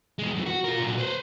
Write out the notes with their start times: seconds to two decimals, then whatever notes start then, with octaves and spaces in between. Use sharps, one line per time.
0.19 E2 G#3
0.35 F#2 E3
0.46 F#4
0.64 F4 A#4
0.79 A#2 F#3
0.97 B4 C5